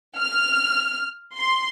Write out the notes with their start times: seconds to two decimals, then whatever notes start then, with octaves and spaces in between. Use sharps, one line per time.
0.18 F6
1.36 C6